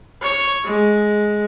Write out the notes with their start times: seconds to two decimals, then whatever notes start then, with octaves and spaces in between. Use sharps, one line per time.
0.22 C#5
0.64 G#3